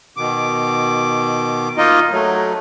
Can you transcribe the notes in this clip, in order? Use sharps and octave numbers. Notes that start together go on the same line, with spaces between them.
B2 D#3 D6
A#3 D#4 F4 D#5
F#3 A3